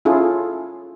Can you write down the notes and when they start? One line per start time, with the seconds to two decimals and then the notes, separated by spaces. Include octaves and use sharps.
0.05 C#4 E4 F4 G#4 A4